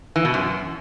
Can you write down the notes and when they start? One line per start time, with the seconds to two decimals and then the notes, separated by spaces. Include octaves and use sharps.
0.16 E3
0.25 B2
0.34 F#2